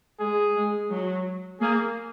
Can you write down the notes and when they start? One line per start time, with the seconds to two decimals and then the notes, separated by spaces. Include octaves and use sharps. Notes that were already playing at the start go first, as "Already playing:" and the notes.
0.20 G#3 G#4
0.56 G#3
0.90 F#3
1.61 A#3 G#4